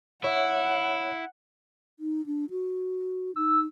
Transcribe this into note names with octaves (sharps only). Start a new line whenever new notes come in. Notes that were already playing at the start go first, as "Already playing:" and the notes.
E4 C#5 E5 F#5
D#4
D4
F#4
D#4 E6